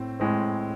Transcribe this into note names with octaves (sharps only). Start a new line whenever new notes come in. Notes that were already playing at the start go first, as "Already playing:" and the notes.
Already playing: A2 C4
A2 G#3 C4